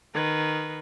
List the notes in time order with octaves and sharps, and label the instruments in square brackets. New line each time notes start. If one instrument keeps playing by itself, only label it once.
[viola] D#3 B4